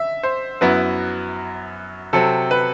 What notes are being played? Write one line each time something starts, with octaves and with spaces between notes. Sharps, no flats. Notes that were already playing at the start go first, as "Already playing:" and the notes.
Already playing: E5
C5
F#2 F#3 B3 E4 B4
C3 F#3 C4 A4
B4